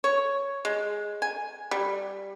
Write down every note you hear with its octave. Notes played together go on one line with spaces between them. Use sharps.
C#5
G#3
G#5
G3